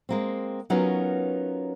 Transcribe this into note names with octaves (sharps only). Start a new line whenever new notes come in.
G#3 A#3 C4
F#3 B3 C#4 D#4 F4 A#4